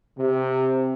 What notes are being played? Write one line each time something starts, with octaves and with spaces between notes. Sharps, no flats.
C3